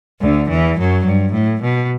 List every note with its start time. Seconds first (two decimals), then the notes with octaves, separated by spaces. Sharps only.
0.20 D2 D3
0.48 E2 E3
0.77 F#2 F#3
1.04 G2
1.33 A2
1.61 B2